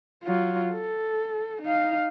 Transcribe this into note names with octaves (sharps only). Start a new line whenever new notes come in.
F#3 F4
A4
D#4 F5